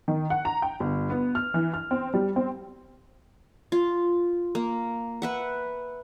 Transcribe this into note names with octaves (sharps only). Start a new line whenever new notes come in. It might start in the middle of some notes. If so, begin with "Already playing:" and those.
D#3
F#5
A#5
G5
G1
B3
F6
E3
F6
C4
G3
C4
F4
A#3
B4 E5 F#5